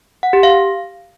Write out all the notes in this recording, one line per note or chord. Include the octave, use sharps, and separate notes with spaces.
F#5
G4
F5